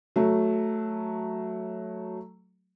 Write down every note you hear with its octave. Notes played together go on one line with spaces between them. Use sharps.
F#3 A3